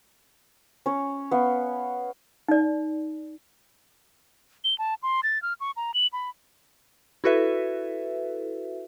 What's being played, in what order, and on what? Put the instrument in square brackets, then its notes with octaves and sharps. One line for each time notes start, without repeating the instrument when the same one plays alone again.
[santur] C#4 C#5
B3 F5
[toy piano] D#4 D5
[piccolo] G7
A5
C6
A6
F6
C#6
A#5
F#7
B5
[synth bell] E4 F#4 A4 B4 E5